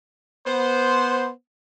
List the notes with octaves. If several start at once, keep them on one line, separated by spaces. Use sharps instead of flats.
B3 C5